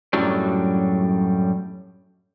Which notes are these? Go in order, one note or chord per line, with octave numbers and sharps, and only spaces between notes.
F#2 A2 F#3 G3 D4